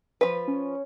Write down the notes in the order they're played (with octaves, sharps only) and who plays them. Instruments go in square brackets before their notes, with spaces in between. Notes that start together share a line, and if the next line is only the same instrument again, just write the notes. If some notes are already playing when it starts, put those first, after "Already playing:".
[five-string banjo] F3 B4
[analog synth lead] C#4